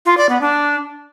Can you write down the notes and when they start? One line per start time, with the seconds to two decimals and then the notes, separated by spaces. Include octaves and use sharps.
0.06 F4
0.17 D5
0.29 B3
0.41 D4